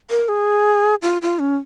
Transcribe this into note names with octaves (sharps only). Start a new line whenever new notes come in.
A#4
G#4
F4
F4
C#4